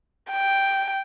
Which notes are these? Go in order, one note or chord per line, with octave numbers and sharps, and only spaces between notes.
G5